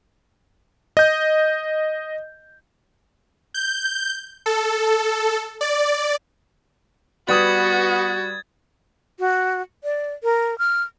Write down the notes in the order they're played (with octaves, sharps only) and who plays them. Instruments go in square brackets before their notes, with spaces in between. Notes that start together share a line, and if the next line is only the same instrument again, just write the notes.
[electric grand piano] D#5 G6
[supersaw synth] G6
A4
D5
[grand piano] G3 B4 D#6 [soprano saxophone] B3 [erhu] F#4 [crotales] G#6 A6
[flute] F#4
D5
A#4
F6